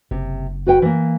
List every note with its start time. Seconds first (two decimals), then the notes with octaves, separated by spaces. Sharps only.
0.11 F#1 C3
0.67 F#4 B4 G5
0.82 E3 A#3